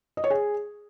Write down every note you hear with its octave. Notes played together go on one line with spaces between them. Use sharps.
D#5
C#5
G#4